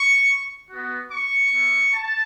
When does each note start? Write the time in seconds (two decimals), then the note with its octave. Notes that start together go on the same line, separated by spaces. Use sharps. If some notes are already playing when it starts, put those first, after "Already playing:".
Already playing: C#6
0.70 B3 F#4
1.11 C#6
1.53 B3 E4
1.94 A5